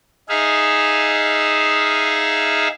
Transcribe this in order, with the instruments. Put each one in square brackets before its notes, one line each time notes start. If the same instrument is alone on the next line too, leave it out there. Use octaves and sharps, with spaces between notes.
[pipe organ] D#4 G#4 E5 F5